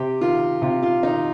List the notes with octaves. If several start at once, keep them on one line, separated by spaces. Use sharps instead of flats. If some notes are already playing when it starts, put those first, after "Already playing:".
Already playing: C3 G4
D#3 F4
C3 F4
F4
D#3 D#4